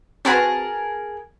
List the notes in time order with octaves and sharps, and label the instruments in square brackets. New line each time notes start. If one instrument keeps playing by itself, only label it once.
[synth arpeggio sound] C4 F#4 B4 [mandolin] G#4 A#4 A5